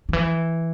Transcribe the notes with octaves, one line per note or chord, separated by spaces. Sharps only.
D#3
E3